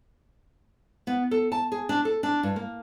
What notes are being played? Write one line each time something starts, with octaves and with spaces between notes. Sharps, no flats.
B3
A4
A5
G#4
D4
A4
D4
G2
A#3